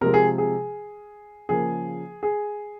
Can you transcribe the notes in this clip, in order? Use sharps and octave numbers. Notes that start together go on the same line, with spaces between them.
C3 F3 G#3 A#4
G#4
G#4
C#3 F3 A#3 G#4
G#4